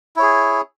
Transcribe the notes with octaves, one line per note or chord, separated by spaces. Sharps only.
E4 G#4 C#5